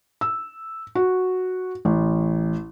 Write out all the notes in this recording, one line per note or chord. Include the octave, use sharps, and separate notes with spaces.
E6
F#4
A1